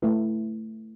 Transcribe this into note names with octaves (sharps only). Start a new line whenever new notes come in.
A3 E4 B4